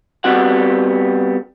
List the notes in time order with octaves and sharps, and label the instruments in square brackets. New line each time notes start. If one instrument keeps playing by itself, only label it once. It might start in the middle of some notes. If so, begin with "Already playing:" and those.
[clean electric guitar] G3 B3 C4 F#4 F#5